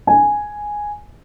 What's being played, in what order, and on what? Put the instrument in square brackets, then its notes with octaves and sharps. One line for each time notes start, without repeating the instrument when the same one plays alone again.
[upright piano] G#5